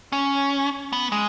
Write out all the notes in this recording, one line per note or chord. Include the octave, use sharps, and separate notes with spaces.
C#4
B3
G#3